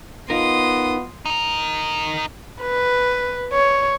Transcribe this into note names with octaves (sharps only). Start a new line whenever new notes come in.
B3 D#4 F4 A#4 D#5 F5 C6 D#6
D#4 A#4
B4
C#5